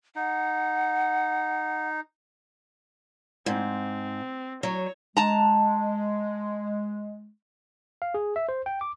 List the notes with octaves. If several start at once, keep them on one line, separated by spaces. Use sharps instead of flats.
D#4 F#5
G#2 C4
F#3 C#5
G#3 A5 A#5
F5
G#4
E5
C5
G5
D6